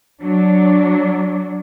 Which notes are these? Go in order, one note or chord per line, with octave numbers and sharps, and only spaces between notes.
F#3 D4